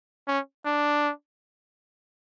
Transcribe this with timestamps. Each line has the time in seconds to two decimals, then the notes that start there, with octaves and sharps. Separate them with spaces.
0.27 C#4
0.65 D4